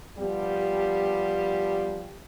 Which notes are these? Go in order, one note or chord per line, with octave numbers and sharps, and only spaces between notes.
F3 G3 B3 G4